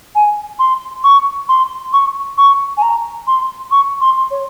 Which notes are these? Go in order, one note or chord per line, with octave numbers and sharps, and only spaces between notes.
G#5
C6
C#6
C6
C#6
C#6
G#5
A#5
C6
C#6
C6
C#5